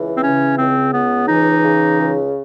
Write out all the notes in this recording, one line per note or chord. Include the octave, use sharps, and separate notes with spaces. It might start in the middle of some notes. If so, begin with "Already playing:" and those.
Already playing: C#2 E3
C4
C#3 C#4
C#2 C4
C#2 B3
E3 D#4
C#3
C#2